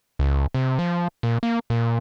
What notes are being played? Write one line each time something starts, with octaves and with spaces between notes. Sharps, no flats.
C#2
C3
F3
A#2
A#3
A#2